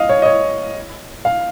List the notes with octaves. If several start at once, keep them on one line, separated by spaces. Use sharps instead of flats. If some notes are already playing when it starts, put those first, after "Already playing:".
Already playing: D#5 F5
C#5
D#5
C#5
F5